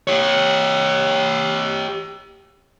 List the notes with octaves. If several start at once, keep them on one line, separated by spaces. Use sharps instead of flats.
G4 C#5